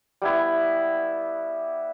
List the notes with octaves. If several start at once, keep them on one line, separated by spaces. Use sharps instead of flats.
G3 B3 E4